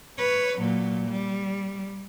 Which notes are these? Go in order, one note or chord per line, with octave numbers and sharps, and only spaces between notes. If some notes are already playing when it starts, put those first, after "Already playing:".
B4 C#5
A#2 F#3
G3